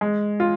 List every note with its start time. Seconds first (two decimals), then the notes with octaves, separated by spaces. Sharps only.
0.01 G#3
0.40 F4